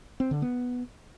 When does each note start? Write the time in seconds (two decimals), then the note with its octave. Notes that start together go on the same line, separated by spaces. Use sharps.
0.20 C4
0.31 D3
0.42 B3